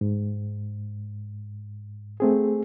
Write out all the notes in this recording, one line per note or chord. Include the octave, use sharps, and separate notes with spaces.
G#2
A3 C4 G#4